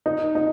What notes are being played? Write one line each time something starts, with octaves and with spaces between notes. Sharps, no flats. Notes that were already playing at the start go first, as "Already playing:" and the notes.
D#4
D#4